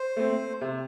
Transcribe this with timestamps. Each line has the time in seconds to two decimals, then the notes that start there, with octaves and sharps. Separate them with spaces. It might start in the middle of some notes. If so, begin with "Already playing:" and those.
Already playing: C5
0.16 A3 C4
0.61 C3